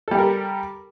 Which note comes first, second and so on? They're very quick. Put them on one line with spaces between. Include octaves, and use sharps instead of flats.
A4 G3 G4 A#4